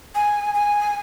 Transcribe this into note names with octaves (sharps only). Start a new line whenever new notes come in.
G#5
G#5